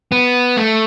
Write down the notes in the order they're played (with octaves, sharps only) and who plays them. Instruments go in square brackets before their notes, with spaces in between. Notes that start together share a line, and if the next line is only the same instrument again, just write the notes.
[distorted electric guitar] B3
A3